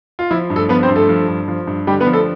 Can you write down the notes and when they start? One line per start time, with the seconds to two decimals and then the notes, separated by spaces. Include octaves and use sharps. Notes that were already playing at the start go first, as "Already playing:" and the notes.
0.19 F4
0.31 F3 E4
0.50 G2
0.56 A3 A4
0.69 F3 B3 B4
0.83 C4 C5
0.90 G2
0.96 A3 A4
1.09 F3
1.28 G2
1.48 F3
1.67 G2
1.87 D3 G3 G4
2.00 B3 B4
2.07 F3
2.13 A3 A4